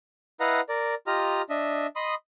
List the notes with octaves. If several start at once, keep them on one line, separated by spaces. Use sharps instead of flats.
E4 B4 D#5 F5 F#5 A#5
A#4 D5
F4 G4 D#5 A#5 F6
D4 D#5 E5
D#5 B5 C6 D#6